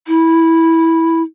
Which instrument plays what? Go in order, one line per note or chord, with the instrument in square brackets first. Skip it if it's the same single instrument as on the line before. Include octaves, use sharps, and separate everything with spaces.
[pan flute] E4